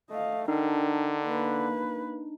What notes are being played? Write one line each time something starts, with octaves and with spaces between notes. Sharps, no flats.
A3 D#5 F5
D3 D4 D#4 A#4 G5
A#3 B4